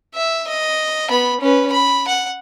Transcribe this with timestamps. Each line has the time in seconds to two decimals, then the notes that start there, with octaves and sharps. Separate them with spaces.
0.14 E5
0.47 D#5
1.10 B3 B5
1.41 C#4 B4
1.72 B5
2.08 F#5